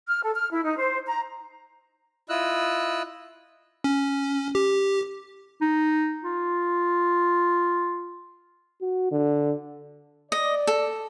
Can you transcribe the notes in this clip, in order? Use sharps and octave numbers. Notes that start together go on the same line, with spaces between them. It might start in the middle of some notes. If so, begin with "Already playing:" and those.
F6
A4
F6
E4
D#4
C5
A#5
E4 F4 D#5 E6 F#6
C#4
G4
D#4
F4
F#4
D3
D5 D#5
A4